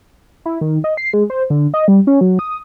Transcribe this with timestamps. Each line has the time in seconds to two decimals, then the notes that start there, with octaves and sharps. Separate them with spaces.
0.46 E4
0.61 D#3
0.84 D#5
0.97 C7
1.13 G#3
1.30 C5
1.50 D3
1.74 D#5
1.88 G3
2.07 C#4
2.21 F#3
2.39 D#6